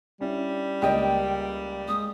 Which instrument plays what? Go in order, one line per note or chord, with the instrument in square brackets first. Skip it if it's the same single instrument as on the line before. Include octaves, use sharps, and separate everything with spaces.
[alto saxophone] G3 [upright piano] C#4 D4 E4
[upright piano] C#2 A#3 D5 [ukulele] G4 D#5 [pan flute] G5
[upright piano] G#3 [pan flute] D#6